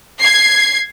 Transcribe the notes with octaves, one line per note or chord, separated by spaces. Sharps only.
G#6 C7